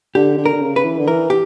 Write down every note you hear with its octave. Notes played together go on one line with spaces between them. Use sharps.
D3 G4
D3
A#4
D3
C#3
B4
E3
D3
E3 A#4
G4